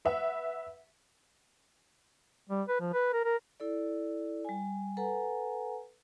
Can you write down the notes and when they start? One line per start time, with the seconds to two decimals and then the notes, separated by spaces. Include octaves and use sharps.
0.05 B4 E5 F#5
2.49 G3
2.68 B4
2.80 F3
2.93 B4
3.13 A#4
3.25 A#4
3.60 E4 A4 D5
4.45 G3 G#5
4.97 A4 B4 F#5 G#5 A#5